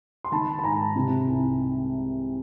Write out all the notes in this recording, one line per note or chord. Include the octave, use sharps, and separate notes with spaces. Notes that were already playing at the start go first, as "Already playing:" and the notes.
C6
D#3 A5 B5
B5
G#2 G#5 A#5
C3
C2